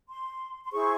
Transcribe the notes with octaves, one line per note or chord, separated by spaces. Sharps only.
C6
C6
E4 G#4 C5 C#6